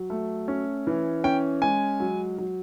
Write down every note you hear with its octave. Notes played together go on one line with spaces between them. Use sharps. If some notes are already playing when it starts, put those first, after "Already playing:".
Already playing: F#3
A3
C#4
E3
C#4 G5
G#3 G#5
F#3
F#3